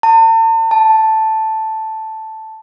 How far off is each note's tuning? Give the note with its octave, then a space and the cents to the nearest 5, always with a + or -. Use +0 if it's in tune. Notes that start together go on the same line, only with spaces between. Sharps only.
A5 +40
A5 +0